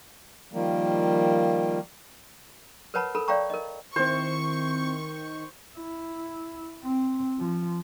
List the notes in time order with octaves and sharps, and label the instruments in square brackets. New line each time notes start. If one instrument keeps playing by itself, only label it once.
[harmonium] D#3 F3 G3 A#3
[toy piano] A#4 B4 C#5 F#5 A5 B5
A4 A#4 B5
C#5 D5 F5 G5 A#5 C#6
A#4 D#5
[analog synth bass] D#3 [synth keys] C4 E4 [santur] C5 [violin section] C#6
[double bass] E4
C4
F3